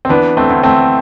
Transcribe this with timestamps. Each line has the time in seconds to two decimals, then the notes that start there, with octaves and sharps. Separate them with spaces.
0.05 C4
0.09 E3 B3 D4
0.37 A3 C4
0.50 D2
0.63 A3 C4